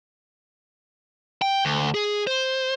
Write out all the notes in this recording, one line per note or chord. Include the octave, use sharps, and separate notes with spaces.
G5
D2
G#4
C5